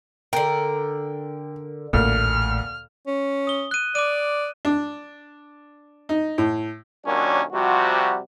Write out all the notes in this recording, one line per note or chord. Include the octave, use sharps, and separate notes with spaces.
D3 A#4 G5
A1 D2 A#2 A3 F6
C#4
D#6 G7
F#6 D#7
D5 D6 D#7
D4
D#4
A2
D#2 A#2 F#3 C#4 D4
C3 F3 G3 F#4